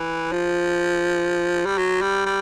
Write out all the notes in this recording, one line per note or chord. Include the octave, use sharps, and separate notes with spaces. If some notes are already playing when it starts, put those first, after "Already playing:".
Already playing: E3
F3
G3
F#3
G3
G3